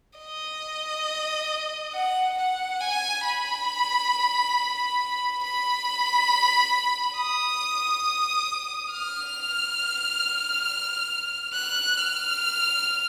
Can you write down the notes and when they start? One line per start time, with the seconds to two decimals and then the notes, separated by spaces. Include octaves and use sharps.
0.19 D#5
1.94 F#5
2.37 F#5
2.80 G#5
3.24 B5
5.43 B5
7.17 D#6
8.92 F6
11.53 F#6
11.97 F6